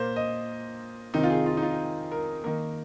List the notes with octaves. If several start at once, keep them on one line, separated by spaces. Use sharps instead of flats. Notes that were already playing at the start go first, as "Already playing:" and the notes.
Already playing: A#2 A#3 C5
D#5
C3 D#3 C4 D#4
F4
G#4
F4
D#4
F4
A#4
D#3 A#3 A#4